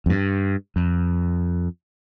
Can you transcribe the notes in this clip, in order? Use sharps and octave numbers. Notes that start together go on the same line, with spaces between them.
F2
G2
F2